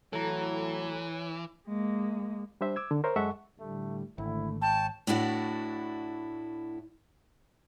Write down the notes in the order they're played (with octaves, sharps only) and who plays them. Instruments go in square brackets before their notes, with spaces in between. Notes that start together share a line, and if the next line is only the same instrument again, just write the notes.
[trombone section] A2 F#3 [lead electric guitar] E3 [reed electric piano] A4 A#5 [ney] C#5
[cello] G#3 A#3
[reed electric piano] G3 D4 C5 E5
D6 E6 G#6
D3
A#4 C5 C#5 E5
F#2 G#3 A4 E5 F#5 C#6
[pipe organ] A2 D3 G3 [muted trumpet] A3
[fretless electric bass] G#1 [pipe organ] D3 A3 [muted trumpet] E4
[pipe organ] C#5 [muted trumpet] G5 [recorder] A5
[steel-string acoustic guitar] A2 D4 E4 F#4